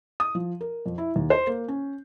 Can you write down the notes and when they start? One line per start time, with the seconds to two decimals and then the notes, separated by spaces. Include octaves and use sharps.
0.20 D#6
0.35 F3
0.61 A#4
0.86 F2
0.98 E4
1.16 D#2
1.30 C5
1.47 A#3
1.68 C#4